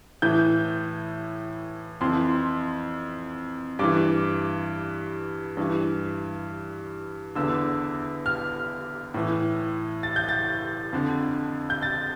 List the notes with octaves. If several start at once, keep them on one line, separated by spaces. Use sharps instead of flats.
A2 E3 G6
F2 E3 C6
G2 E3 D6
G2 E3
E2 D3 E6
F6
A2 E3
A6
G6
A6
F2 D3
G6
A6